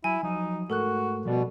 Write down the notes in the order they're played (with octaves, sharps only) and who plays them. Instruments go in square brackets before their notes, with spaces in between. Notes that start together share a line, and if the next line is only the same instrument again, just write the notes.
[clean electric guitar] F#3 [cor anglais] E4 [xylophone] G#5
[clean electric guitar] F3 F#3 [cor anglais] D#4
[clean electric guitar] G#2 A3 [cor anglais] F#4 [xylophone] A4 A#4 F#6
[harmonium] B2 [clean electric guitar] F3 G3 D5